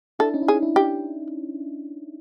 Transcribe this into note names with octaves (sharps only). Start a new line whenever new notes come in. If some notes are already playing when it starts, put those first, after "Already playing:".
D4 E4 A4
C#4 D#4
E4
C#4 D#4 G#4
D4 E4
D4 E4 G4